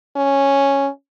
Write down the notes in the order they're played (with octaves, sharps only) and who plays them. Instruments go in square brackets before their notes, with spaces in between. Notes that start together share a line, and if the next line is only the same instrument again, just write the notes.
[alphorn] C#4